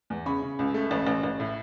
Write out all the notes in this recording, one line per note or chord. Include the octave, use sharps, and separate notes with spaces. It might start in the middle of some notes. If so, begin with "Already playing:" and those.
E2
C#3 B5 C#6
C#3
C#2
A3
A1
A1
A1
A2